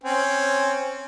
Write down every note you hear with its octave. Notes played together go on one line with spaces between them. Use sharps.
C4 C#4